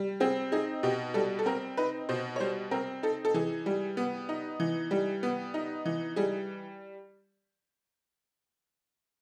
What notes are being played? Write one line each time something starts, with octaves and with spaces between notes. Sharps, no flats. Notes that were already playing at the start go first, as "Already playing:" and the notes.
Already playing: G3
C4 G#4
D#4 G#4
B2 G4
G3 A4
A4
C4 A#4
D#4 B4
B2 C5
C#5
G3 C5
C4 A#4
D#4 A4
A4
E3 G#4
G3
B3
D#4
E3
G3
B3
D#4
E3
G3 G#4